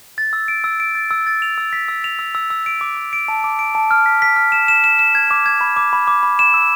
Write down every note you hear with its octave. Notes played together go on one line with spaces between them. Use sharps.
A6
E6
D7
E6
D7
A6
E6
A6
F7
E6
B6
E6
F7
E6
E6
E6
D7
D6
D6
D7
A5
D6
D7
A5
F6
B6
B6
F6
E7
E7
E7
E7
G#6
D6
G#6
B5
D6
B5
D6
B5
E7
E6